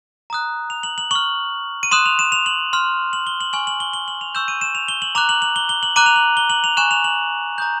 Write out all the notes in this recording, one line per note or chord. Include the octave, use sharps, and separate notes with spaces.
A#5 D#6 F#6
F7
F#7
F#7
C#6 F6 F#7
D#7
C6 D#6 F#6 E7
F7
E7
F7
F#7
C6 F6
F#7
G7
F#7
G#5 C#6 F6 F#7
F#7
G7
G7
F#7
F7
C#6 E6 G6 E7
D#7
E7
F7
G7
F#7
A#5 D6 F#6 F7
F#7
F#7
G7
G7
F#7
A#5 D6 F#6 D#7
F7
F#7
G7
F#7
F7
G#5 C#6 F#6 E7
F7
F#7
A#5 D#6 G6